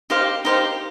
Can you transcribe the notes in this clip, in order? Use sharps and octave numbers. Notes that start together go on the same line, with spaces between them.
D#4 G4 C5 F5
D#4 G4 C5 F5